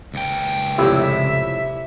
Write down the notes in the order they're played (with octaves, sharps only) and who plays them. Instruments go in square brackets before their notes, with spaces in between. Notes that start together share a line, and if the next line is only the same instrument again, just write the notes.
[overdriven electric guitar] C#2 G5
[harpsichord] C2 [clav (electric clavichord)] F2 A2 E4 [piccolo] E6
[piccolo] E5